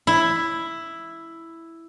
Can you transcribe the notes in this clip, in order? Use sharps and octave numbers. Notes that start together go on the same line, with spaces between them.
E4